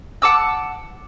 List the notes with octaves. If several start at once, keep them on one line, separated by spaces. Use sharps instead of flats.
F#5 A5 D6 E6